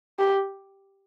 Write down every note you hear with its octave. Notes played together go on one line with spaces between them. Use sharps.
G4